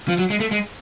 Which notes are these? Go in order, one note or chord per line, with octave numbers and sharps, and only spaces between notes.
F3
F#3
G#3
A3
G#3